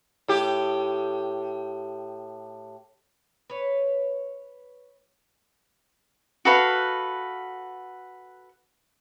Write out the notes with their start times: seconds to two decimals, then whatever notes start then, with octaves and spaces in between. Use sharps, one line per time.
0.28 A2 G4
3.50 B4 C#5
6.45 F#4 A4 B4 F5